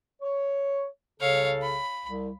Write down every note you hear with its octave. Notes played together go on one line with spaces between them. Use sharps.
C#5
C2 C#3 A4 C#5 F5
B5
C2